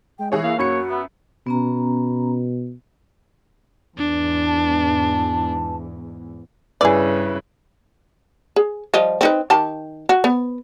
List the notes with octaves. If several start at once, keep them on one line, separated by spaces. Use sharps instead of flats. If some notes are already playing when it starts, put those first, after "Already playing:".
G#3 G5
E3 E4 G#4 C#5
A#3 F5
F#2 F#4 C#5 B5 C#7
B3 E5
B2 B3 C#4 A#5
E2 G#2 D4
A5
G2 C#3 E4 G#4 B4 D5
G#4
F3 G3 D#5
C4 D#4 B4
D#3 G4 A5
F#4
B3